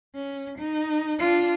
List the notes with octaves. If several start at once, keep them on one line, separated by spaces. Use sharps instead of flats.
C#4
D#4
D4 F4